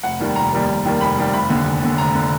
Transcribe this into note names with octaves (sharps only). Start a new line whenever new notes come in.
F1 F#5
D#2 D#3 G3 A#3
F1 A#5
D#2 D#3 G3 A#3
F1
D#2 D#3 G3 A#3
F1 B5
D#2 D#3 G3 A#3
F1 B5
D#2 D3
F1
D#2 D3
F1 A#5
D3